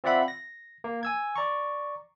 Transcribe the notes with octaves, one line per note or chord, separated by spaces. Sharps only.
C4 F4 D5 E5 F#5 B5
A#6
A#3
G#5 E6 G#6
D5 A#5 C#6